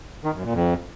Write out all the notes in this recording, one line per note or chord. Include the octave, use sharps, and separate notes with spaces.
D#3
F#2
A#2
F2